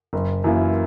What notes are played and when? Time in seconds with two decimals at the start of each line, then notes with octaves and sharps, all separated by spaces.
0.13 F#1
0.44 F#2 E3 A#3 E4